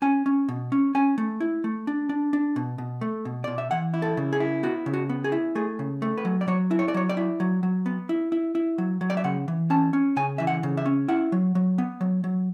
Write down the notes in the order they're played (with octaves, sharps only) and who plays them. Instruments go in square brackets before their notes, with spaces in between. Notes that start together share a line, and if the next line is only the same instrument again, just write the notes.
[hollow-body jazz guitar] C#4 G#5
C#4
B2
C#4
C#4 G#5
A3
E4
A3
D4
D4
D4
B2
B2
A3
B2
B2 D5
E5
E3 F#5
E4
A4
C#3
G#4
E4
B3 F#4
C#3
F#4
B3
G#4
E4
A3 G#4
C#3
A3
B4
F#3
D5
F#3 C#5
E4
C#5
D5
F#3 C#5
D5
E4
F#3
F#3
B3
E4
E4
E4
F#3
F#3
D5
E5
C#3 F#5
E3
C#4 A5
C#4
C#3 G#5
E3 E5
F#5
C#3
E5
C#4
E4 F#5
F#3
F#3
B3
F#3
F#3